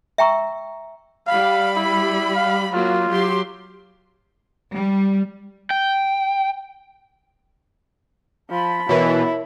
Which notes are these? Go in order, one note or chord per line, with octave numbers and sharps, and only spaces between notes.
E5 G5 A#5 C#6 E6
G3 F5 B5
E4
F5
F#3 A#3 F4 F#4
F#3 G4 C6
G3
G5
F3 A5 B5
B2 E3 E4 A#4 C#5